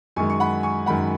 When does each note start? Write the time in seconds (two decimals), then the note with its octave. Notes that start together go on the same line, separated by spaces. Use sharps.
0.16 F#2 D#3 G#3 G#5 C#6
0.30 C#6
0.40 F#5 B5
0.63 G#5 C#6
0.86 F#2 D#3 G#3 F#5 B5